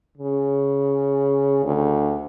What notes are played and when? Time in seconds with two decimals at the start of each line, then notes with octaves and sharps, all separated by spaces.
0.17 C#3
1.64 D2